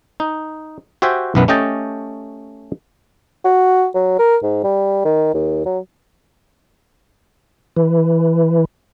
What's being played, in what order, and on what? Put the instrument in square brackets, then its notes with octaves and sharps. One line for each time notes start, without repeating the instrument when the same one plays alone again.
[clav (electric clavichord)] D#4
F#4 G4 C5 E5 G5 G#5
B1 F#2 E3 B3 B4
A3 C#4 G4 D#5 G5 A5
[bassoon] F#4
F#3
A#4
G#2
G3
D#3
D#2
F#3
[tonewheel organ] E3